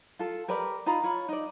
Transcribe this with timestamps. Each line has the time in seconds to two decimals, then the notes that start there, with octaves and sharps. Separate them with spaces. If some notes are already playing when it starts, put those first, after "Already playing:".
0.19 F4 A4
0.48 G4 A#4 B4 D5
0.86 D#4 F4 A#5 B5
1.03 F4 C#5 B5
1.29 D#4 D5